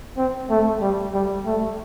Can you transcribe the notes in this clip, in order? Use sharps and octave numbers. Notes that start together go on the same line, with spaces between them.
C4
A3
G3
G3
A3